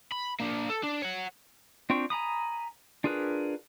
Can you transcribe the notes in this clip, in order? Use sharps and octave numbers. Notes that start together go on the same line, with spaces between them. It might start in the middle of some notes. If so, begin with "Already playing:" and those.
B5
A#3 D4
A4
D4
C#5 F#5
C4 D4 F4 G5 C#6
G#5 A#5 B5 D#6
D4 F4 G#4 A#4 B4